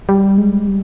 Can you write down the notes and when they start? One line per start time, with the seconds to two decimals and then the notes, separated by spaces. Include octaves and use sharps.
0.09 G3
0.38 G#3
0.67 G3